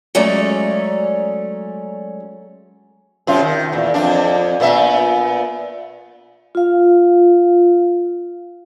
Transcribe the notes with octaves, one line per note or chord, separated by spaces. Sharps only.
F#3 G#3 A3 C#4 D5 A#5
F#2 C3 F4
D#3
E2 A#2
F2 G#2 D4
A#2 B3 E5
F4 F5